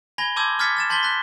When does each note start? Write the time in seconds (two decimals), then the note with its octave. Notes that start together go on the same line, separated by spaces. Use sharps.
0.18 G#5 B5 G#6 A#6 F7 G7
0.36 A5 C6 D6 E6 G6 G#6
0.59 D6 F6 G#6 A6 B6 C#7
0.77 F6 A6 E7
0.90 A5 C6 G6 A6 B6 G7
1.03 F#6 A6 B6